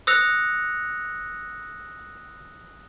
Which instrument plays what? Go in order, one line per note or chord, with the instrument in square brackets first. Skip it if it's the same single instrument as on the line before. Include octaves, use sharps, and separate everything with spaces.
[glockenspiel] D#6 E6 F#6 A#6 C#7 F7